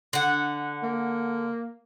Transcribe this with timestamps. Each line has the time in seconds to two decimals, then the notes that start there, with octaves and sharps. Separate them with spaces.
0.13 D3 F#5
0.83 A#3